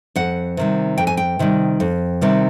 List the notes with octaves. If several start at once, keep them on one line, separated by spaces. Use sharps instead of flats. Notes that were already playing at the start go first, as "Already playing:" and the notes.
F2 F#5
C3 D#3 G3
F2 G5
G#5
G5
C3 D#3 G3
F2
C3 D#3 G3